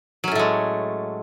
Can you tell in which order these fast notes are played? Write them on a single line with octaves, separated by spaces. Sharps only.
F#3 C#4 A2 A3 G#3